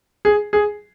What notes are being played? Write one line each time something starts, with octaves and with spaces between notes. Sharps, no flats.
G#4
G#4